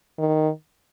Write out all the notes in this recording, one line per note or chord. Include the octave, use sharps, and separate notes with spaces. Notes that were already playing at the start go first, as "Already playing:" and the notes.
D#3